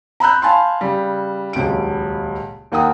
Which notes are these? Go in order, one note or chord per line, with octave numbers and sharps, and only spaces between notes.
A#5 B5 E6 F#6 G6
F5 G#5 A5 B5 C6
C#3 G3
D#1 C#2 F#3 D7
D#2 A#3 F#5 G5 D#6